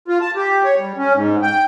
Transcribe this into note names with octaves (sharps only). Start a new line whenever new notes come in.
F4
A5
G4
C#5
G3
C#4
G#2
G5